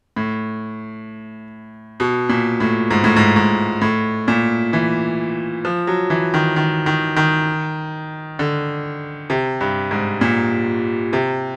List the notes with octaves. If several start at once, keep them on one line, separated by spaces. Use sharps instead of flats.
A2
B2
A#2
A2
G#2
A2
G#2
G#2
A2
A#2
E3
F3
F#3
E3
D#3
D#3
D#3
D#3
D3
C3
G2
G#2
A#2
C3